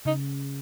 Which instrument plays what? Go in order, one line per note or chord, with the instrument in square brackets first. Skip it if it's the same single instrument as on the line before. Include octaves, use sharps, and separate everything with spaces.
[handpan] C#3 [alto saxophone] D#4